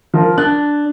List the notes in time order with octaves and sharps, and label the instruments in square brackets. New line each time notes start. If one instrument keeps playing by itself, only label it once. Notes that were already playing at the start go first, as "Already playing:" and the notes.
[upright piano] F3 A#4
[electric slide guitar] D4 [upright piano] F#6